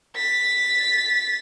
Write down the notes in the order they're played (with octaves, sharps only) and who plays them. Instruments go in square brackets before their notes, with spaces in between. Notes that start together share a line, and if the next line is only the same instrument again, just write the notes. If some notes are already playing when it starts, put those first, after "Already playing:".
[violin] A6 B6